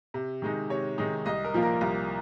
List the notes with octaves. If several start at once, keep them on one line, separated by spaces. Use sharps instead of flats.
C3
D#3 G#3 D#4
C3 C#5
D#3 G#3 D#4
C2 D#5
A#4
A#2 F3 A#3 F4
A#4
C2